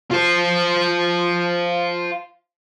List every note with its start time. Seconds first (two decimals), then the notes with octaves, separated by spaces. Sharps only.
0.11 F4 C5